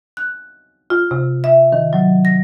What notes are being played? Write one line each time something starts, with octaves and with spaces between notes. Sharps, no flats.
F#6
F4
C3
E5
D#3
F#3
A#6